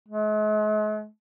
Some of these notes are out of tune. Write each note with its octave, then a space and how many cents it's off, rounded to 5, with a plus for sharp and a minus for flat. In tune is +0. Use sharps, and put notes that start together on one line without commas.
G#3 +45